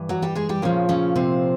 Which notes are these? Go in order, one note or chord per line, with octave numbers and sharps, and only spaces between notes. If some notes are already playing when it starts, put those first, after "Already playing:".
Already playing: G2 E3
F#3 F#4
G3 G4
G#3 G#4
G3 G4
A#2 C#3 F3 C#4
C#3 C#4
C3 C4